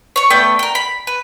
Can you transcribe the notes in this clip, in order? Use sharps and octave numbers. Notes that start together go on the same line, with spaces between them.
C#5 C#6
A3 B3 D5 G5
A#4 G5
B5
B4